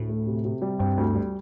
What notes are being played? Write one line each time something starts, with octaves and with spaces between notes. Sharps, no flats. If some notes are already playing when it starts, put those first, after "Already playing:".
Already playing: D2 A2
A3
C3
C3
G3
G2 C4
D2
G3